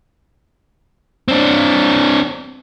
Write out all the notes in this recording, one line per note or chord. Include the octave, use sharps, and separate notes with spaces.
C4 D4